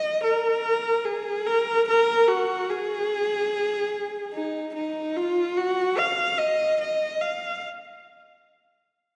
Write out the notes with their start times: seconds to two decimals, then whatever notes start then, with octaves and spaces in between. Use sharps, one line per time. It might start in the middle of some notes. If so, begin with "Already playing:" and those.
Already playing: D#5
0.23 A#4
1.05 G#4
1.46 A#4
1.88 A#4
2.28 F#4
2.70 G#4
4.33 D#4
4.74 D#4
5.16 F4
5.57 F#4
5.98 F5
6.38 D#5
6.80 D#5
7.21 F5